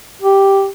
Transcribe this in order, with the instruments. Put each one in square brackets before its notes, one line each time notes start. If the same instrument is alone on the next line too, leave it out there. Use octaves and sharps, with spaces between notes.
[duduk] G4